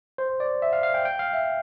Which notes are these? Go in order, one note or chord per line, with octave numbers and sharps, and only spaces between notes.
C5
D5
E5
F5
F5
G5
G5
F5
E5